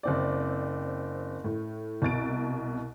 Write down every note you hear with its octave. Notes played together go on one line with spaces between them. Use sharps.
F#1 C4 D5
A2
C2 B2 A6 D7